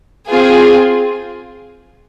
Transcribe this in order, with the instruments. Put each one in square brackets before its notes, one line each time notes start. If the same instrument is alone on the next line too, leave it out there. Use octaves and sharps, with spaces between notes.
[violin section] C4 F4 G#4